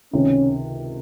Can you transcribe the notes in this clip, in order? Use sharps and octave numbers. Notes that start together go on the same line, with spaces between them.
C#2 C3 D#3 C#4